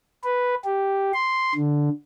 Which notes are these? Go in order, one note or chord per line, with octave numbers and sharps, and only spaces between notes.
B4
G4
C6
D3